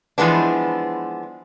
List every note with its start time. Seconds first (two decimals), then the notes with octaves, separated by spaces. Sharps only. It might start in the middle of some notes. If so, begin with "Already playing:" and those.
0.18 E3 F3 G#3 B3 D4